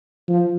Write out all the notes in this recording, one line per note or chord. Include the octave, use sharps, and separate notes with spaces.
F3